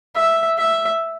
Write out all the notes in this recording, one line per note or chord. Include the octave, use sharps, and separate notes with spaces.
E5
E5